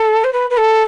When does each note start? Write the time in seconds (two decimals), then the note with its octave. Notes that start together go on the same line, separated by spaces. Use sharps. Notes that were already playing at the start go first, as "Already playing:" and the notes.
Already playing: A4
0.24 C5
0.33 B4
0.50 B4
0.57 A4